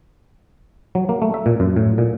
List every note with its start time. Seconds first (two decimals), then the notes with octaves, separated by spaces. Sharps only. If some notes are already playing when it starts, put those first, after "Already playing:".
0.95 F#3
1.09 A#3
1.22 A3
1.34 E5
1.46 A#2
1.60 F#2
1.77 A2
1.98 A#2